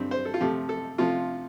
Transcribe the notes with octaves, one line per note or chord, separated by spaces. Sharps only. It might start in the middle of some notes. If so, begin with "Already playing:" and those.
Already playing: G2 G3 C4
C5
A4
F4
C3 F3 A3 G4
A4
C3 F3 A3 F4